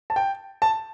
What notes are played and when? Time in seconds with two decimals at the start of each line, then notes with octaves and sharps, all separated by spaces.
0.10 A5
0.16 G5
0.62 A5